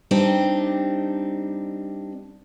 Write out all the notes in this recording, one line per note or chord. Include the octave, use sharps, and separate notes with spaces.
G3 C4 D4 D#4